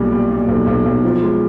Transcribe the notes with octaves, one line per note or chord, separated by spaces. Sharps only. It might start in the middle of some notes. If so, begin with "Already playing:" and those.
Already playing: B1 A#2 G3
G3
A#2
B1
B1
B1
F3
G#3